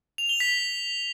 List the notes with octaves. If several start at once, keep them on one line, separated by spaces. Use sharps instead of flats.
F7
G7
B6